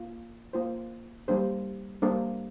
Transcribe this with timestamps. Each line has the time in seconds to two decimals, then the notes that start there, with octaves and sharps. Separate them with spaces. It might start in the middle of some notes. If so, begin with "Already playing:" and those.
Already playing: A#3 F4
0.53 A#3 F4 C5
1.28 G3 A#3 D4 A4 C5
2.02 G3 A#3 D4 A4 C5